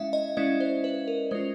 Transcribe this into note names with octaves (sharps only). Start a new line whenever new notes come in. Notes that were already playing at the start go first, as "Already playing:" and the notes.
Already playing: G#3 C#4 E4 E5 F5
D#5
G#3 C#4 E4 D5
C5
B4
A#4
G#3 C#4 F4 C5